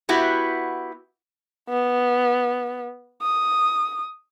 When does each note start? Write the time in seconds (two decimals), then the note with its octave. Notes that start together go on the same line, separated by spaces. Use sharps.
0.09 B3 E4 F#4 G4
1.69 B3
3.22 D#6